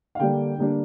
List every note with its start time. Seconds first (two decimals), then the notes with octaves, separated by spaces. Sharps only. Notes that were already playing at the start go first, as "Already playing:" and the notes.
0.15 F5
0.20 D3 G3 A#3 D4 G5
0.58 D3 G3 A#3 D4